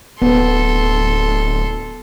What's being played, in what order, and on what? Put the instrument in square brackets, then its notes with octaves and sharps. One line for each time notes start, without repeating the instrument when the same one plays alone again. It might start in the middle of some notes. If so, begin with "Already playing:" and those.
[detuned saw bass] D1 [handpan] B3 [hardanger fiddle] A4 C6